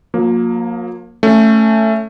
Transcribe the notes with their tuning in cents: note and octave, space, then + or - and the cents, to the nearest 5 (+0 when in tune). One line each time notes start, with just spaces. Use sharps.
F3 +45 A#3 +0
A3 +5 C#4 +0